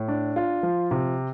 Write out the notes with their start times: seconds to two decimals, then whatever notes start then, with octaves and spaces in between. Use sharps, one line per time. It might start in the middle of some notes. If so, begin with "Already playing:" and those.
Already playing: A2
0.08 D4
0.36 F4
0.63 F3
0.91 C3